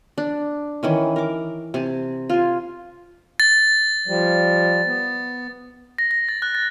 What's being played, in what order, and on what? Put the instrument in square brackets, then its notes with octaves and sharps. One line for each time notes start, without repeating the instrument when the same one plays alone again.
[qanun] D4
D#3 E3 C#4
A#4 D6
C3 G#5 A5
F4 G#5
[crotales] A6
[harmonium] F3 G3
B3
[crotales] A#6
A#6
A6
F#6
A6